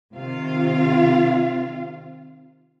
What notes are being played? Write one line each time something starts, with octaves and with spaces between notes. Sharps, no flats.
C3 D#3 F4 F5